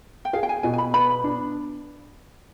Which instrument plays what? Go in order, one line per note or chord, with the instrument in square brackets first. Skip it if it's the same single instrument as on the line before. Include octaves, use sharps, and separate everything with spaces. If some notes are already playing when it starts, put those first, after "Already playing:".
[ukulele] G5
[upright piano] G#4 [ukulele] F5
[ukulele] G5
G#5
[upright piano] B2 [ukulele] G#5
[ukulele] G#5
B5
[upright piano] B3 [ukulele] B5
[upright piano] D4